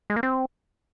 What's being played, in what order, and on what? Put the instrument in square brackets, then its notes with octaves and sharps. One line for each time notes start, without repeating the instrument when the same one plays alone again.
[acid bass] G#3
A#3
C4